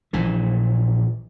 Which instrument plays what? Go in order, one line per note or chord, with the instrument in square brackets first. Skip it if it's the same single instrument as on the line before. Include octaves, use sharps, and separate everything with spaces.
[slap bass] A#1 A#2 E3